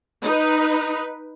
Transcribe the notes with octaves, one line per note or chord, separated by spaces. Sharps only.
D#4 B4